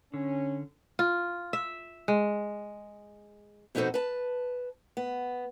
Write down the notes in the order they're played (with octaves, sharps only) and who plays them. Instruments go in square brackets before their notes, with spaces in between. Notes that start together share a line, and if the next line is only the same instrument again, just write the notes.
[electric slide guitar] D3 [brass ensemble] C#4
[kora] F4
E5
G#3
[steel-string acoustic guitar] F2 B2 D#4 F#4 A4 C5
B4 A5
B3